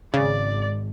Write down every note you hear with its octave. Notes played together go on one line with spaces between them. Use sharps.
G#1 C#3 D5